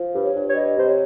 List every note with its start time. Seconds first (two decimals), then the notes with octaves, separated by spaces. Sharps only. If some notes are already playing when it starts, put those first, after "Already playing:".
Already playing: F3
0.14 G2
0.24 C#5
0.35 G2
0.49 C#5
0.55 G3 D#5
0.77 C3 C5
0.87 C#5